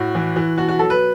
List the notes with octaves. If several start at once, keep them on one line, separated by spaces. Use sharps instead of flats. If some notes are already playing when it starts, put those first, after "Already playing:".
Already playing: A2 F#4
E3
E3
B2 F#4
F#4
F#3 A4
B4